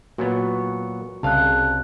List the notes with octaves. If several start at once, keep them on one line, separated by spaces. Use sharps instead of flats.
A#2 F#3 B3 F#4
C2 C#3 F5 A5 F#6